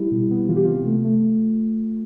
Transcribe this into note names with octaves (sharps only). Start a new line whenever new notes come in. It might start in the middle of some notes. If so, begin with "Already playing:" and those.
Already playing: G3 E4 G4
B2
B3
E3 F4
G4
C3 F4
A3
A3